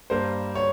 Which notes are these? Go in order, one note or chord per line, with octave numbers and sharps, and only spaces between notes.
G2 G3 A#3 C5
C#5